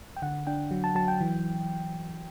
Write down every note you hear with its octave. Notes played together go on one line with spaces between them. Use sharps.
G5
D3 F#5
D4 G5
F#3
A5
F#3 A5
G5
E3